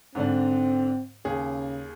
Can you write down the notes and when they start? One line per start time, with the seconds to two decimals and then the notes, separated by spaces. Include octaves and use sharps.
0.15 G#2 D3 C4 D4
1.25 D#2 C#3 G#4